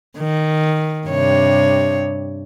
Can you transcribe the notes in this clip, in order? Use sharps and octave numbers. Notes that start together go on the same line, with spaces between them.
D#3
G2 C3 C#5